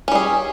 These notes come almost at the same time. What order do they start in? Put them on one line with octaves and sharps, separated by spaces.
C#4 G3 G#4